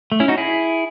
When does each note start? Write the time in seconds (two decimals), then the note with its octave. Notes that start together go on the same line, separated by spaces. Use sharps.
0.12 A3
0.20 C#4 E4
0.28 D#4 F#4
0.38 E4 G#4